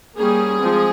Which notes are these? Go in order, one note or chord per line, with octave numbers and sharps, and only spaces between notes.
G3 A#3 C#4 G#4
F3 G#3 C4